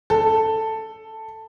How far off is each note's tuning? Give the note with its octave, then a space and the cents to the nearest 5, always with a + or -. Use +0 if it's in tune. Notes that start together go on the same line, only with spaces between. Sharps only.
A4 +5